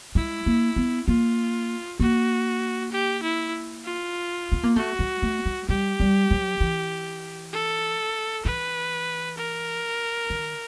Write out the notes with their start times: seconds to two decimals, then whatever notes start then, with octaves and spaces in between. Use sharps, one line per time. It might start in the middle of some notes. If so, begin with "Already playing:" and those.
0.15 G#3 E4
0.46 A#3
0.76 B3
1.08 A#3 F4
2.00 A#3 F#4
2.92 G4
3.23 E4
3.84 F4
4.52 B3
4.63 A#3
4.76 A3 F#4
4.99 G#3
5.22 A3
5.46 G#3
5.69 G3 G4
6.00 G3
6.31 F#3
6.60 E3
7.53 A4
8.45 E3 B4
9.38 A#4
10.30 D#3